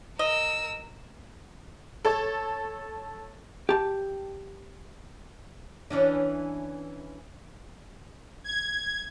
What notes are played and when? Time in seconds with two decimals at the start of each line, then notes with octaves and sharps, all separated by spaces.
0.19 A#4 D#5 E6
2.05 A4 C#5
3.69 G4 A5
5.90 E3 C#4 D4
8.44 G#6